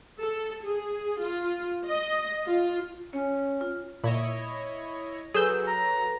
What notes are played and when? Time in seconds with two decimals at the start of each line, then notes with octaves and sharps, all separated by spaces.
0.20 A4
0.64 G#4
1.21 F4
1.87 D#5
2.47 F4
3.13 C#4 C#5
3.61 F4
4.04 A#2 E4 C#5 D#5
5.34 F#3 G#4 A4 B4 E6 G6
5.68 A#5